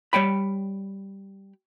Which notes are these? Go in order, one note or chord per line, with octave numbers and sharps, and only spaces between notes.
G3 C#5 G5 B5